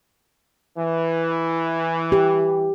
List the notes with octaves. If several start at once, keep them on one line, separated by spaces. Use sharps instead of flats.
E3
G4